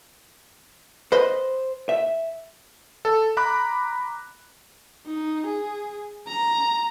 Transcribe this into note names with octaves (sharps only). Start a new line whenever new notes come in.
B4 C5 D#5
E5
A4
A#5 B5 D6 F#6
D#4
G#4
A#5